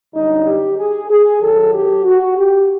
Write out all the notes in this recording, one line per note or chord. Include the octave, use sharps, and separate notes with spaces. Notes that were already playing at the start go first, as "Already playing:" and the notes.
F#2 D3 G3 D#4
G4
G#4
G#4
F#2 D#3 F#3 A4
G4
F#4
G4